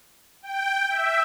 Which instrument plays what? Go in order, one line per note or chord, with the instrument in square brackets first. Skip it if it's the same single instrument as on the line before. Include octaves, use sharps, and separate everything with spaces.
[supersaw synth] G5
E5